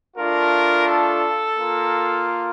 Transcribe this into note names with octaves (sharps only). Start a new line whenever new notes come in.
A3 D4 F4 A#4
A4
A#3 F4